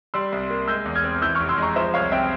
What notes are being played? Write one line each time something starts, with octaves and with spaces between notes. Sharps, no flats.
G3 C6 E6
C2
A#3
G#3 E6 G6
E2
F6 G#6
C4
E3 E6 G6
C#6 F6
F1
C6 E6
G#3 A#5 C#6
F3 C5 E5
C2 C#5 F5
C4 E5 G5